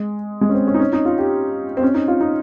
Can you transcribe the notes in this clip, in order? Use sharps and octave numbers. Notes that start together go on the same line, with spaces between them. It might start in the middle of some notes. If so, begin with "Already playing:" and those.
Already playing: G#3
G#3
C#4
C4
C#4
D#4
C#4
D#4
F4
G4
C4
C#4
D#4
F4
D#4